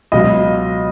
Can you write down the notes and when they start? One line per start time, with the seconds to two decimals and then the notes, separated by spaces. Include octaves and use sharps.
0.12 C#2 B2 F#3 D#5